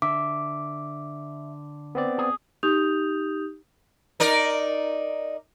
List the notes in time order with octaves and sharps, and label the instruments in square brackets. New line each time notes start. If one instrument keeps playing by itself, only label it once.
[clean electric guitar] D3 [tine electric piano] E5 [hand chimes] D6
[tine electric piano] B3 C4 D5
[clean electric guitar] G#4
[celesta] D#4 G4 D#6 G6 F7
[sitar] D#4 A#4 D5